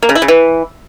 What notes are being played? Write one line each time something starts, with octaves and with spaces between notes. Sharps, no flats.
A#3
C#3
E4
C#3
E3